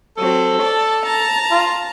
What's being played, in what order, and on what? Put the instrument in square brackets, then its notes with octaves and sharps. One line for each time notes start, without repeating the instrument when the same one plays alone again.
[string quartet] F#3 C4 [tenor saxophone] A4
[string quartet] D5 A5
A5 A#5
[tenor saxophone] F4